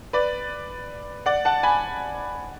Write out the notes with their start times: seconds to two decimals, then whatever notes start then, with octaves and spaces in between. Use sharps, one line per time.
0.13 B4 D5
1.26 D5 F#5
1.45 F#5 A5
1.63 G#5 B5